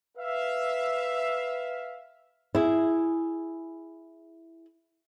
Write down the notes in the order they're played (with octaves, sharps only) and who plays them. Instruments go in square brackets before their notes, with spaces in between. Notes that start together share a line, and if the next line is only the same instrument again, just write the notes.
[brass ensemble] B4 E5 F5
[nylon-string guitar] E4 G#4